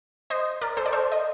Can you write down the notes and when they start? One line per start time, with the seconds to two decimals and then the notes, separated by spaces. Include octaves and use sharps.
0.30 C5 D#5
0.61 A#4 D5
0.77 A4 C5
0.86 D5
0.93 A4 C5
1.12 D#5